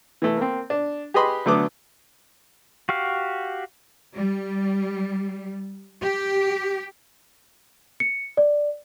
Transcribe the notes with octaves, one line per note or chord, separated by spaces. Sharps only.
E3 A3
A#3 C4
D4
G4 G#4 B4 D#5 B5 C6
D3 F#3 A3 B3 D6 D#6
F#4 G4 F5
G3
G4
C#7
D5